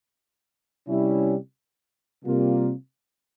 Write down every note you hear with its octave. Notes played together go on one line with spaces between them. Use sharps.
C3 G3 C#4 E4
C3 G3 A#3 F4